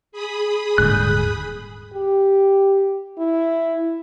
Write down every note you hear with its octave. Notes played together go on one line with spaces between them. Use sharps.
G#4 B5 D#6
D#1 G#2 D3 F#6 G6
G4
E4